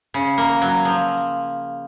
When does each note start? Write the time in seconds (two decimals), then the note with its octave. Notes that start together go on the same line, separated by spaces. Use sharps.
0.14 C#3
0.38 A#3
0.62 F#3
0.85 F3